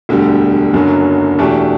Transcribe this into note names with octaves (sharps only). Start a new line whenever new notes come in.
E1 D2 D3 G3
F#1 F#2 D3 F#3
E2 B2 A3 D4 G4